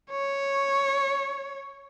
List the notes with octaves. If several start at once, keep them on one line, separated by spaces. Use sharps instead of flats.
C#5